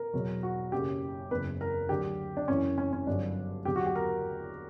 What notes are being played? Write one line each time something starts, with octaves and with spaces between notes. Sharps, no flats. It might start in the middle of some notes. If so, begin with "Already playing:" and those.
Already playing: A#4
E2 B2 F#3
F#4
F#1 F#2 C#3 G4
F#1 E2 C#3 B4
A#4
D2 D3 F#3 G4
D4
F#1 F#2 E3 C#4
C#4
C#4
G1 G2 F#3 D4
E2 D3 F#3 G4
F#4
G4
A#4